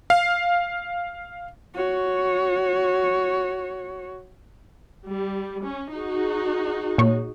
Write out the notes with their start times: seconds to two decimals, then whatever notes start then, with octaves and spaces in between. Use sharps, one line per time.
0.10 F5
1.74 F#4 C#5
5.08 G3
5.64 C#4
5.93 D#4 F#4 G#4
6.98 A#2 C#5